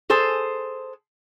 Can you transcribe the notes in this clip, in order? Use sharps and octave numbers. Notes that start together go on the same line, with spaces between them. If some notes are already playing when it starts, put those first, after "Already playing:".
G#4 A4 C5 G#5